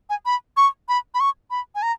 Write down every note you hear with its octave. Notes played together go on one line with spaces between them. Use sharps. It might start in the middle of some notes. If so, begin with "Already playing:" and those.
G#5
B5
C#6
B5
B5
C#6
B5
G#5
A#5